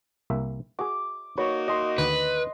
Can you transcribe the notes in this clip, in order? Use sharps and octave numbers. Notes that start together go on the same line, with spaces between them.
C2 A#3 E5
F#4 G#4 D6
A#3 D#4 F#4 B4 C#5
D#5 C6
D2 D#3 B4